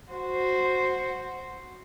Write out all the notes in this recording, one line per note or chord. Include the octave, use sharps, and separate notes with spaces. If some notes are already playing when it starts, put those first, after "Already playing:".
F#4 C5